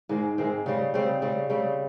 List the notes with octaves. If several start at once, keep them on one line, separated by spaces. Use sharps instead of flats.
G#2 D#3 G#3 C4
G#2 D#3 G#3 C4
C#3 G3 C4
C#3 G3 C4
C#3 G3 C4
C#3 G3 C4